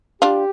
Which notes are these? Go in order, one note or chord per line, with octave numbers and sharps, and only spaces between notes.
D4 F4 G4